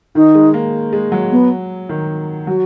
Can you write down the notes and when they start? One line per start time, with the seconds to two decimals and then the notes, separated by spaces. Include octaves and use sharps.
0.15 D#3 D#4
0.35 G#3
0.54 A#3
0.93 G#3
1.12 F#3
1.31 B3
1.89 D#3
2.47 F#3 F#4